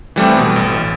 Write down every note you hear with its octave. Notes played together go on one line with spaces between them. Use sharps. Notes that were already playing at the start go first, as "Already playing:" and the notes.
E3 G3 A3 C4
B2
A1